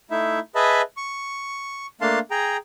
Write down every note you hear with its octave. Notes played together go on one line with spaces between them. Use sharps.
A3 D#4 E4 E5
G#4 B4 D#5 E5 A5 B5
C#6
A3 A#3 D4 F5 A5 C6
G#4 G5 A#5